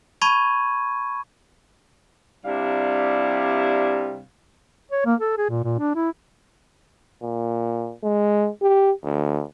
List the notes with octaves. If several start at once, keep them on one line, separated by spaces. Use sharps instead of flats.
A5 B5 C#6 G#6 D#7
C3 G3 D4 E4 F5
C#5
A#3
A4
G#4
A#2
A#2
D4
E4
A#2
G#3
G4
D2